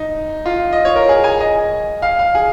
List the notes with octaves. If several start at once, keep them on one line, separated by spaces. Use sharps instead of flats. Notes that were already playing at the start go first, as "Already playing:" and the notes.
Already playing: D#4
F4
D#5
C#5
A#4
G#4
G#5
D#5
F5
F5
G#4